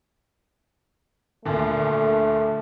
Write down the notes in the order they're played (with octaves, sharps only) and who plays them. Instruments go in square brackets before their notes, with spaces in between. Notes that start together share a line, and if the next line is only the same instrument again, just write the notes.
[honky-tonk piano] D2 A#2 D3 [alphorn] A3